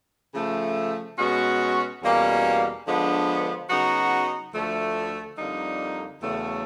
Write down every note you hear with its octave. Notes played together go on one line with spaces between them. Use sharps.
C#3 F3 A3
B2 G#3 C#4 F#4
E2 B2 G3 A#3 C#4
D3 F3 G#3 B3 D4
C#3 F#3 B3 D#4 F#4
D2 D3 F3 A3
F2 D3 G3 A#3 D#4
E2 C#3 F#3 A3